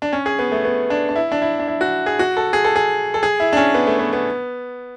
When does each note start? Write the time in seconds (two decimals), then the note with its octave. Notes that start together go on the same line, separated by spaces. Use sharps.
0.02 D4
0.13 C#4
0.26 G#4
0.39 B3
0.52 A3
0.65 B3
0.90 D4
1.09 D4
1.16 E4
1.32 D4
1.42 E4
1.59 D4
1.68 E4
1.81 F#4
2.06 G#4
2.19 F#4
2.37 A4
2.53 G#4
2.64 A4
2.76 G#4
3.14 A4
3.23 G#4
3.40 E4
3.53 D4
3.57 C#4
3.74 B3
3.87 A3
3.99 B3
4.13 B3